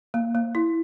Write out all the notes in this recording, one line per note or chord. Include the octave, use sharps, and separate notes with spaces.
A#3
A#3
E4